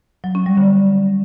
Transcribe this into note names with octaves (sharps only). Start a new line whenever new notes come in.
F#3
C#4
G3
D3